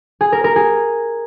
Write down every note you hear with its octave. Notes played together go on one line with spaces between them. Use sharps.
G#4
A#4
A#4
G#4